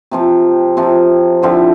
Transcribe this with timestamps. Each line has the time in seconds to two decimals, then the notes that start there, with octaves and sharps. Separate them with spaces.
0.11 C3 F3 C4
0.77 C3 F3 C4
1.42 D3 F3 C4 E4